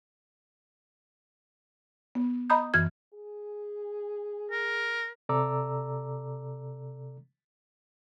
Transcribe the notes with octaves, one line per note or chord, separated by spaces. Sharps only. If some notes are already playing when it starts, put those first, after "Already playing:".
B3
D#5 A#5 B5 D#6 G6
F#2 E3 F6 G#6
G#4
A#4
C3 A4 D5 A#5 D6 E6